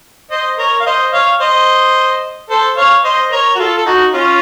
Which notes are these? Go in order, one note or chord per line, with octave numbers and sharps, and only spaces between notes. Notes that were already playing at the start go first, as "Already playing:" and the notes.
C5 D#5
A#4 C#5
F5
C5 D#5
C#5 F5
C5 D#5
A4 C5
C#5 F5
C5 D#5
A#4 C#5
F#4
F4 A4
A4
D#4 F#4
C#4 F4